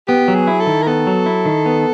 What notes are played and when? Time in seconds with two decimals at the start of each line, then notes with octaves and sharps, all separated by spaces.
0.08 B3 G4
0.28 F#3
0.35 G#4
0.47 E4
0.61 A4
0.67 D#3
0.82 A#4
0.87 B3 A4
1.07 F#3
1.26 E4
1.45 D#3
1.66 B3